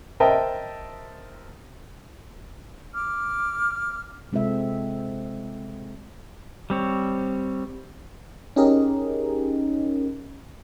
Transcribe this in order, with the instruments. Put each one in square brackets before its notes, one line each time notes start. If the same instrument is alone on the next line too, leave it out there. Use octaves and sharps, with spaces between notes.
[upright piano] A#4 C5 D#5 E5 G5 A5
[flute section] D6 F6
[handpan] C3 G#3 C4 F4 A4 E5
[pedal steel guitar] G3 C4 C#5
[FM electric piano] C#4 D#4 G4 G#4 A#4 D#5